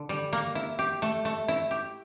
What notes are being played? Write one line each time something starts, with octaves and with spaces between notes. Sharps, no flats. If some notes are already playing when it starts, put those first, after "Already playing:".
Already playing: D3
G3
A#3
E4
G4
A3
A3
E4
G4